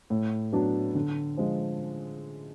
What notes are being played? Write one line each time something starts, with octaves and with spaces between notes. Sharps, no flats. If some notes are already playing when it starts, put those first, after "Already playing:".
A2
F#3 B3 D4
D3
F3 G#3